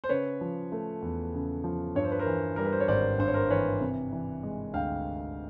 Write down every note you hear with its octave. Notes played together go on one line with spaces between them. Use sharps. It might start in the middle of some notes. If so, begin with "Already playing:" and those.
C5
C#3 B4 C#5
F3
A3
E2
C#3
F3
G2 C#5
C5
B4
A#4 C5
E3
G3 A#4
B4
C5
C#5
G#1 C5 D5
G2 C5
C#5
A#4 C5
E3 B4 C#5
C3
E3
G#3
D2 F5 G5